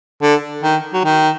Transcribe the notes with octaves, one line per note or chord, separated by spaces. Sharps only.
D3
D#3
F#3
D#3